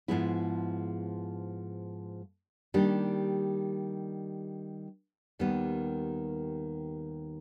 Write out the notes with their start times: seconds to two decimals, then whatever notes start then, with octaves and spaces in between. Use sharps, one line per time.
0.08 G#2 F3 G#3 B3 E4
2.74 D#3 G3 A#3 D4 G4
5.39 D#2 D#3 G3 B3